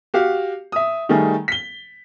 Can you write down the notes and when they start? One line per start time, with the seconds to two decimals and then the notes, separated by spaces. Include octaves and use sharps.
0.14 F#4 G4 F5
0.72 E5 D#6
1.09 D#3 G3 A3 G#4
1.48 B6 G7